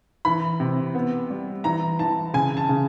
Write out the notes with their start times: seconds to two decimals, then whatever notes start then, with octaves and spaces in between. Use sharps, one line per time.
0.25 E3 B5
0.60 C3
0.95 B3
1.30 G3
1.64 E3 A#5
1.99 E3 A5
2.34 C#3 G#5
2.57 A5
2.69 C#3